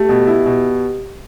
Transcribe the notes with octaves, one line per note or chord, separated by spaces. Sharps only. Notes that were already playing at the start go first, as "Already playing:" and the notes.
Already playing: A3 G4
B2
E4
B2